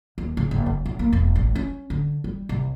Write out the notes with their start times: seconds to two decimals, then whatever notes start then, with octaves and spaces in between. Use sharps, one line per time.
0.18 D#2
0.37 C#3
0.51 F#1
0.66 D3
0.86 B1
0.99 A#3
1.13 E1
1.36 A1
1.55 C#4
1.90 D3
2.24 G3
2.49 C2